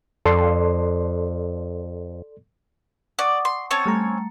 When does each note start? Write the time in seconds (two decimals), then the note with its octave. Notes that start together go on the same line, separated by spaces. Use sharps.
0.26 F2 A4 D5 C6
3.19 D5 F#5 C#6 D#6
3.45 C6
3.71 C4 C#4 C#5 A5 A6 C#7
3.86 G3 A3 A#5